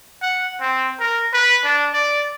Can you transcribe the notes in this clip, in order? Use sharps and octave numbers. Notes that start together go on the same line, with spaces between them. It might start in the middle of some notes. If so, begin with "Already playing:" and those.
F#5
C4
A#4
B4
D4
D5